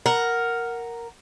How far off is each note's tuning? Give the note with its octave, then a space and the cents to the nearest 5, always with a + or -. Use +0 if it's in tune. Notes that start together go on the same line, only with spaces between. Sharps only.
A#4 +0 F#5 +0